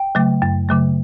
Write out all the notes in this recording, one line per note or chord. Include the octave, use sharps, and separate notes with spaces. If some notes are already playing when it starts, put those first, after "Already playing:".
Already playing: G5
C#3 F#3 A3
F#2
C#3 F#3 A3